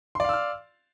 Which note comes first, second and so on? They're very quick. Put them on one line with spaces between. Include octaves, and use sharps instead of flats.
C6 D5 F5 E6 F6